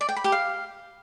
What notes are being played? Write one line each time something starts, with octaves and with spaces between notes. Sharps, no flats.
D5
G5
B5
G4
F5